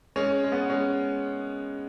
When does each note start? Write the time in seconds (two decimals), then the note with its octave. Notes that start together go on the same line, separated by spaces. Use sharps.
0.16 G#3 C#4
0.44 G#3
0.52 B3
0.70 G#3 C#4